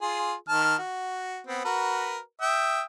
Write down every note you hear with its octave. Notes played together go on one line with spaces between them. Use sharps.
F4 G#4
D#3 A5 F6
F#4
B3 C4
F#4 A#4 B4
E5 G5 D#6